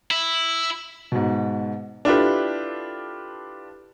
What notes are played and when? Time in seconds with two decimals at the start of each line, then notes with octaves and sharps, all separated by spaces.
0.11 E4
1.12 G#2 B2
2.05 D4 E4 F4 G4 A4 B4